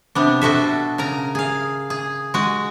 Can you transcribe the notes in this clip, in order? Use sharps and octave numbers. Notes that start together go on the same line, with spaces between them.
C3 B3 D4
B2 F#4 A4 E5
C#3 A#4 A#5
G#4 F5
G#4
G#3 F#4